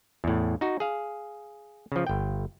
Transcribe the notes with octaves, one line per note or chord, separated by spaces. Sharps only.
E2 A2
D#4 F#4
G#4 F5
C#3 F3
G1 G5